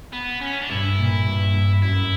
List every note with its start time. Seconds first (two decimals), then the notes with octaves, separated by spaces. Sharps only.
0.12 B3
0.41 C#4
0.62 D4
0.69 G2 E4
0.98 A#2
1.26 G2
1.54 G2
1.82 F#2 E4